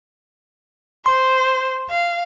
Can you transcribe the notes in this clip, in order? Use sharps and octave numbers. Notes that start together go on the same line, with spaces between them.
C5 C6
F5